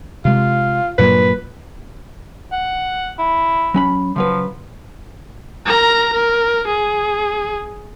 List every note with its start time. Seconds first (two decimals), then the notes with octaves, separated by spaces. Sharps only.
0.25 C3 G#3 F4
0.98 G2 A#2 F#3 B4
2.52 F#5
3.19 E4
3.74 F#3 C#4 B5
4.16 C#3 F3 F#3 B4
5.66 A#4 A#5
6.13 A#4
6.67 G#4